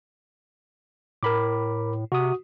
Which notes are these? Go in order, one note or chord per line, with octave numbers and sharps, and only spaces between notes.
A2 A#4 B5 D6
C3 F#4 D#6